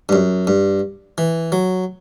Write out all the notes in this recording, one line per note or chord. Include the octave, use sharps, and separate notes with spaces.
G2
F#2
G2
E3
F#3